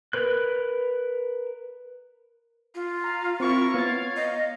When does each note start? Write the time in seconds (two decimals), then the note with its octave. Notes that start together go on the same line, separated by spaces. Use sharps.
0.13 A#4 B4 F#6
2.75 F4
3.04 F5 A#5
3.40 C4 E4 A#4 C#6
3.74 B3 C#5 F5 A6
4.16 D#5